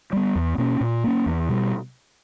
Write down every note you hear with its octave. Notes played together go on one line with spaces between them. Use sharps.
G3 B3
E2
B2 A#3 C#4
A#2
A#3 C#4
E2
B2 G3